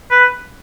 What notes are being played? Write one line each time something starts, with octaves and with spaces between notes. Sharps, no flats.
B4